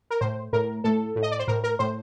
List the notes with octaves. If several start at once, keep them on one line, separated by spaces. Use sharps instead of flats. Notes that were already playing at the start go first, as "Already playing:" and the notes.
A#4
A2 C5
A2 A#4
A2 A4
A2
D#5
D5
C5
A2 A#4
A#4
A2 C5